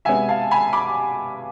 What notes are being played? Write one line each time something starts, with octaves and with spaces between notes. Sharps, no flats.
C3 G#3 B3 E5 G#5
F5 A5
G#5 B5
B5 D6